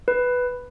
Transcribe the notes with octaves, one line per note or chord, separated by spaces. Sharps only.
B4